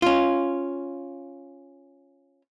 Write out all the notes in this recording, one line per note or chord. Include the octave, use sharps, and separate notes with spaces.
C#4 F4